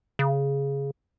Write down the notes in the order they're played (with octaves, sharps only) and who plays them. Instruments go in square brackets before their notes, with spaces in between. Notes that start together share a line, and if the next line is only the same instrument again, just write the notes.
[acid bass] C#3